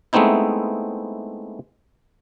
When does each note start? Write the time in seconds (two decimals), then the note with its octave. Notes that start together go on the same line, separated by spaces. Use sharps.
0.13 G#3 A3 B3 C4 D#4 E4